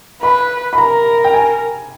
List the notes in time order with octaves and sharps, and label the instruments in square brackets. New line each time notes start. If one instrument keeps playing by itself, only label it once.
[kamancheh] B4 [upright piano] B5
[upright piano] B5
[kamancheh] A#4 [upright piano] A#5
[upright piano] G5
G#5